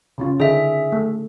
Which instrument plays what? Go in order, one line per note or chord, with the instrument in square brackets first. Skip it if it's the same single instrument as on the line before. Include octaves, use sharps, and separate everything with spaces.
[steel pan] C#3 C#4 F4
[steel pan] D3 D4 D#4 [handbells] G#4 E5
[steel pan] A3